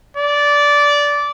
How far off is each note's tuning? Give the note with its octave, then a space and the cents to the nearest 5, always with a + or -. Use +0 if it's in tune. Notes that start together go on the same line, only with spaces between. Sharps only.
D5 -15